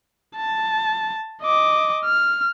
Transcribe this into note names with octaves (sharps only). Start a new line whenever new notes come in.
A5
D#5 D6
F6